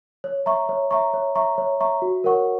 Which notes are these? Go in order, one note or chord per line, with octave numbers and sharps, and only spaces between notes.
C#5
E5 A#5 C#6
C#5
E5 A#5 C#6
C#5
E5 A#5 C#6
C#5
E5 A#5 C#6
F#4
A#4 C#5 F#5 C#6